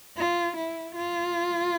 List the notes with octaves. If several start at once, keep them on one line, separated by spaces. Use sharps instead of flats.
F4
E4
F4